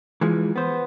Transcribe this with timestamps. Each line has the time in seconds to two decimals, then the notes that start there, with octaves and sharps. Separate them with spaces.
0.21 E3 F3 G#3
0.56 B3 C5